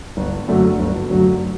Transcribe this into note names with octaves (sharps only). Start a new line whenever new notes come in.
G1
F#2 D3 F#3 A3
G1
F#2 D3 F#3 A3